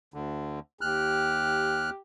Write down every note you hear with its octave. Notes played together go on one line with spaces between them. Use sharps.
D2 D3
D#2 G4 F6 F#6